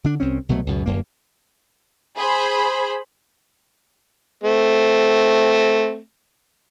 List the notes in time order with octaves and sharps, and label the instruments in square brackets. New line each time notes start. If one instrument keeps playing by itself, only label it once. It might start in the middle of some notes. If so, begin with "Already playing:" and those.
[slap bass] D3 D4
C2 C4 C#4
C2 B2 F#3 A3
C#2 F#2 B2
D1 F#2 A#3
[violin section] G#4 C5 B5
[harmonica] A3 C4